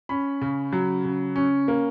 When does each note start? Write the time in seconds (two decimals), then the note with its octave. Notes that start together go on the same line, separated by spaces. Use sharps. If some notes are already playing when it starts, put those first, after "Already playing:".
0.09 C#4 B5
0.42 C#3
0.73 F#3
1.04 C#3
1.36 C#4
1.68 A#3